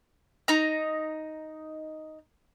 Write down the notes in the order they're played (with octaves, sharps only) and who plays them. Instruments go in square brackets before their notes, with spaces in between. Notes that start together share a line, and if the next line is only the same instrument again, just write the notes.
[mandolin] D#4 A#5